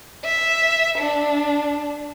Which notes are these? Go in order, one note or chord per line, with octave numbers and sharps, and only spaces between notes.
E5
D4